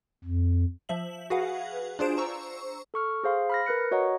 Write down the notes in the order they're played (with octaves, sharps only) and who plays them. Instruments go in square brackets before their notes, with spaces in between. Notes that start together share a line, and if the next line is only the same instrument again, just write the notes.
[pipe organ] F2
[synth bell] F3 E5 F#7
F#4 G#4 B4 F5 F#5
D4 F4 G#4 C5 D7 E7
C5 A#5 C#6 E6
[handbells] A4 C#6 F6
G#4 C5 F5 C6
B5 F6 A#6
A#4 B4 F#6 C#7
F#4 C#5 D#5 F#5 A#5